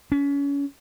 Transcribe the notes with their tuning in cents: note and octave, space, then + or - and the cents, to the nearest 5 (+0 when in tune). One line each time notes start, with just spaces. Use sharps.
C#4 +30